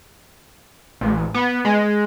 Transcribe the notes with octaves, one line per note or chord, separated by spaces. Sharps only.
A1
B3
G#3